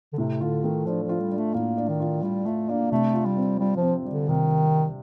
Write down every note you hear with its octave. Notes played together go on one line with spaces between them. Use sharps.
D3
A2 C3
D3 F4
D#3 A3
F3 D4
F3
F4
G3
D4
A3
A2 A#3
D4
D#3
F4
G3 F4
A3 F4
A#3 D4
C3 A3
F4
G3
C4
G3 F4
F3
C4
G3
D3
C3 D#3